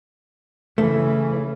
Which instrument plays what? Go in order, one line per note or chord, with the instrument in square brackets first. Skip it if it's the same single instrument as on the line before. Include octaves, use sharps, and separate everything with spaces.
[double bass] C#3 E3 [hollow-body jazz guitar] A3